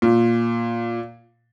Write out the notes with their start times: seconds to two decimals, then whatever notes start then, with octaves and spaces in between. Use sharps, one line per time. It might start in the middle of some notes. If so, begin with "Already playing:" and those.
0.02 A#2